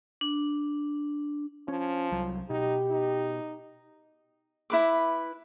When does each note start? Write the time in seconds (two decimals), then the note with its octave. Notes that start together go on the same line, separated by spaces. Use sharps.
0.21 D4
1.68 F3 C#4
2.12 C2 F#3
2.50 B2 D#4 G4
2.91 D#4
4.70 E4 B4 D6